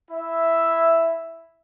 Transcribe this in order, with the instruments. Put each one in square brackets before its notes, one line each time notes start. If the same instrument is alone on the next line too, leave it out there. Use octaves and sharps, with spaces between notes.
[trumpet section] E4 E5